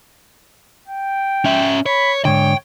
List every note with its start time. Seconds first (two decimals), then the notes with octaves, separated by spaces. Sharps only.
0.88 G5
1.45 C#4 E5
1.86 C#5 B5
2.25 G#2 D3 C#5 G5